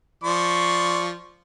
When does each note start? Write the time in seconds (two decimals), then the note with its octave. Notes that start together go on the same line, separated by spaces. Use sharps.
0.24 F3 D5 C6 C#6